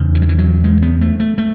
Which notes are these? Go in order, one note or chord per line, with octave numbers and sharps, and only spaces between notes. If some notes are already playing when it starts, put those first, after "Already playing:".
Already playing: E2 C#3
E3
F#3
E3
F#3
G#3
B3
A3
A3
A3